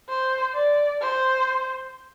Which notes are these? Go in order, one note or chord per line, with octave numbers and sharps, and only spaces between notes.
C5
D5
C5